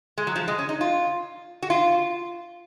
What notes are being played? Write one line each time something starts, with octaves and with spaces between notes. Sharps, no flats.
G#3
F#3
F3
G#3
C#4
D#4
F4
F#4
F4